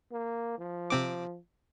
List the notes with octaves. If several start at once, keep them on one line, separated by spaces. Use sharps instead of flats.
A#3
F3
C3 C4 D6